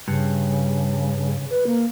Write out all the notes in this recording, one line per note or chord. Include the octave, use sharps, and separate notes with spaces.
G2 C#3
B4
A#3